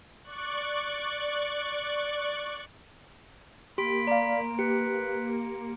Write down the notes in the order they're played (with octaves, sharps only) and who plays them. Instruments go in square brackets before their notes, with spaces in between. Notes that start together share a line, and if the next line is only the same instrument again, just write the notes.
[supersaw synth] D5 C#6 F#6
[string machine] A#3 [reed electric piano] G4 [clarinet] B5 [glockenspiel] C6 D7
[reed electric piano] D5 F5 [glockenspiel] A#5
[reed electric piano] G4 [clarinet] B4 [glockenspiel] C#7